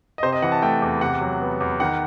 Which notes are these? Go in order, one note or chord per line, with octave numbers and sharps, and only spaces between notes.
D#5
C3 C5
D#5
E3 F#5
A5
A3 G5
E2
C3 F#5
F#3
B3
E2
D#3 F#5